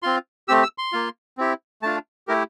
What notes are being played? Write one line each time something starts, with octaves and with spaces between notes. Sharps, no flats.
C4 F4 C6
A3 C4 G4 E6
E6
C6
A#3 F4
C4 E4 G4
A3 D4 F4 A5
A3 E4 G4 A#4